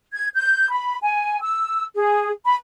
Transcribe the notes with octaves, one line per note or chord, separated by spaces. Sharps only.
G#6
G6
B5
G#5
E6
G#4
B5